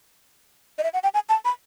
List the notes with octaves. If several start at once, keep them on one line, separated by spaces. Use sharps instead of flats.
D#5
E5
F#5
G5
G#5
A5
B5